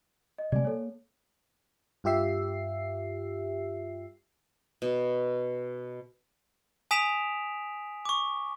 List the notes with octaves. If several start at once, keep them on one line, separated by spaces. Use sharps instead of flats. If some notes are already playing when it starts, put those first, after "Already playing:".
D#5
C3 G3 A3 D5 G#5
A#3 A4 C#5
G2 F4 G4 E5 C7
B2
G#5 D#6 B6 D7 E7 F7
C#6 D6